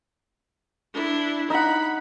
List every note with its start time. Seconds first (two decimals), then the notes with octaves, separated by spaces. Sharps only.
0.94 D4 E4
1.50 D#4 F#5 B5